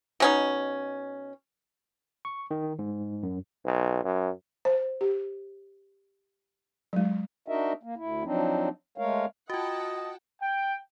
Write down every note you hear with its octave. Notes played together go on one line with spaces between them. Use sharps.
B2 C#4 D#4
C#6
D#3
G#2
F#2
B1
F#2
C5
G4
F#3 G#3
D4 D#4 F#4 A#4 D#5 E5
A#3
D2 E4
F3 F#3 C4 D4 D#4
G#3 A3 A#4 C#5 F5
F4 F#4 D#5 F#5 G5 A5
G5